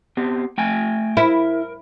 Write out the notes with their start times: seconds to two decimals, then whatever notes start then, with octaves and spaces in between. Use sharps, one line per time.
0.17 B3 C4 G4
0.58 A3 G5 G#5
1.17 E4 A#4